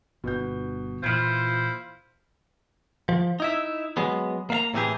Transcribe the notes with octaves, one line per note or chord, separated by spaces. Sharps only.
G1 B2 B3 G6
A#2 E3 E4 F4 C5 F6 G#6
F3
D#4 E4 E5
F#3 G#3 B3
A#3 F5 A#5
A2 C3 E3 D#4 G4 G#4